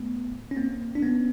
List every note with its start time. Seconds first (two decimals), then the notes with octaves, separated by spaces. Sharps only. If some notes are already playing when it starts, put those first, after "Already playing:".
Already playing: A3 B3
0.51 C#4
0.57 A#3 C4
0.95 D4
1.02 B3 C#4